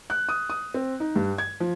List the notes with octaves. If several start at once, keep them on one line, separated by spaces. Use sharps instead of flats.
F#6
D#6
D#6
C4
D#4
G2
G#6
F3